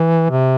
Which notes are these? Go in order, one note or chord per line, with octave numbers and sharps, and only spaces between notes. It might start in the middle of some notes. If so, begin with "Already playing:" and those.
Already playing: E3
C3